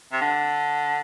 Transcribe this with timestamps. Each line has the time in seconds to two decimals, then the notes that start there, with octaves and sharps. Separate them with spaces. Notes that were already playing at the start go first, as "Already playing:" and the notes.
0.12 C3
0.21 D3